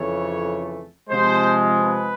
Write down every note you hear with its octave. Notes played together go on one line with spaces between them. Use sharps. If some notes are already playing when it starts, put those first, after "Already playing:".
Already playing: F2 C#3 E3 A3 C#5
C3 F3 G#3 C5
B4